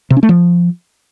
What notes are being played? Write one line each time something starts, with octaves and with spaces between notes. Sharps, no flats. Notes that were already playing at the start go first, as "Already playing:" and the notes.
C3
C#4
A3
F3